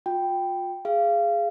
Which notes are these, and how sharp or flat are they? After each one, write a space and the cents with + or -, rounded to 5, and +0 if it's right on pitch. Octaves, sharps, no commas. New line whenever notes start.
F4 +35 G5 +0
G#4 +0 F5 -25